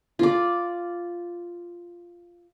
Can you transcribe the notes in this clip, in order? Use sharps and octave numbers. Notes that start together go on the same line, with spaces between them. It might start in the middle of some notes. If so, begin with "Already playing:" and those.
F4 D5